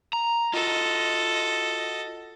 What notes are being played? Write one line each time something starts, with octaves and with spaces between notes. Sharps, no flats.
A#5
F4 F#4 A4 D#5